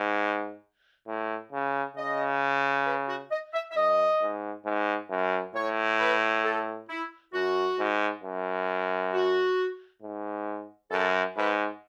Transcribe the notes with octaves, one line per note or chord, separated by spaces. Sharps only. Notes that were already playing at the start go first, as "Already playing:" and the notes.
Already playing: G#2
A2
C#3
C#3 D#5
B4
F#4
D#5
E5
E5
F#2 D#5
G#2
G#2
F#2
A2 C#5
B4
A4
E4
F#2 F#4
G#2
F#2
F#4
G#2
F#2 A4
G#2 B4